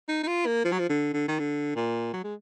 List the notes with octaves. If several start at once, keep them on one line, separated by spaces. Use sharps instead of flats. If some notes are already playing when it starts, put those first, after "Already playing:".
D#4
D#4
F4
A#3
F3
F#3
F3
D3
D3
D#3
D3
A#2
F#3
G#3